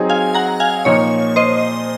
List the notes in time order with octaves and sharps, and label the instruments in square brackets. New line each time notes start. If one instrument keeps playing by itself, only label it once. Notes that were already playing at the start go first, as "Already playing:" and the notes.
Already playing: [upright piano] F#3 C4 D#4 G#4
[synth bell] F5 G#5
F#5 A#5
F5 G#5
[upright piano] A#2 F3 A#3 D#4 [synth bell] C#5
[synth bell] C5 D#5